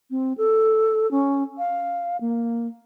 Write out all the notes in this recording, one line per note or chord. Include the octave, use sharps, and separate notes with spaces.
C4
A4
C#4
F5
A#3